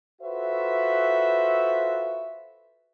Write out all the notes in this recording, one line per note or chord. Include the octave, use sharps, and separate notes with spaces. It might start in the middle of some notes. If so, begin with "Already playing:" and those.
F4 F#4 A4 B4 C5 E5